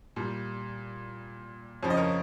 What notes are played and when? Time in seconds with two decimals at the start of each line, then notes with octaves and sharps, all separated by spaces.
0.16 A#2 G3
1.83 F2 C#3 F3 C#5
1.90 D#5
1.97 A#4 C#5